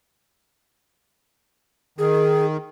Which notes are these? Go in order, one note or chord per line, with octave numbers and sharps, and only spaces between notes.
D#3 G#4